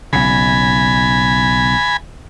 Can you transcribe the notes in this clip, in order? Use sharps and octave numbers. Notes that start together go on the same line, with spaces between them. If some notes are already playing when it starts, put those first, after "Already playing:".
B1 C#3 G#5 B5